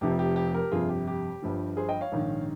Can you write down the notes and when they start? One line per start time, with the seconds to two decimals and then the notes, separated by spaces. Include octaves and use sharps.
0.01 F1 F2 C3 F3 G4
0.19 G4
0.36 G4
0.54 G4 A#4
0.72 G1 F2 C3 F4 G#4
0.89 G4
1.07 G4
1.42 G1 G2 F3
1.77 G#4 C5
1.89 D#5 G5
2.01 C#5 F5
2.12 A#1 G#2 D#3